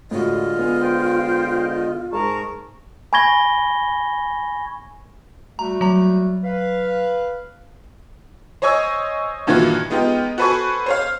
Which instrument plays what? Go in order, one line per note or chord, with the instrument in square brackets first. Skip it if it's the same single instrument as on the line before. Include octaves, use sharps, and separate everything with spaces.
[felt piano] A2 F#4 [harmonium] D3 G#3 D#5 [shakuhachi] F4
[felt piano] B3 [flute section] G#5
[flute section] C5 G5
[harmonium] G#2 G#4 A5 [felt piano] G#3 [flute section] A#4 A#5 C#6
[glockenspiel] G#5 B5 C#6 G#6 A#6 G7
[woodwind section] G3 A3 F#4 [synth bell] A#5
[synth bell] F#3 A#5
[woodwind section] B4 F5
[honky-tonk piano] C5 C#5 D#5 G#5 C#6 E6
G2 A#2 D#3 E3 F4 F#4
G#3 B3 D#4 F4 G4
F#4 A4 B4 C5 G#5 C#6
C5 C#5 F5